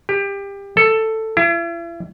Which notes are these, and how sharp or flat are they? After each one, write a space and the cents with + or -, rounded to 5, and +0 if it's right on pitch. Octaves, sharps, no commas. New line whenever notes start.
G4 +25
A4 +10
E4 +40